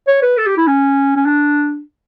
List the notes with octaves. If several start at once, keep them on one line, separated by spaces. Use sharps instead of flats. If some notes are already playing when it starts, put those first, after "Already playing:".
C#5
B4
A4
G4
E4
C#4
C#4
D4